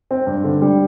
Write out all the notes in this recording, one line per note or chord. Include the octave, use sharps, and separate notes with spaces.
C4
G2
D3
G3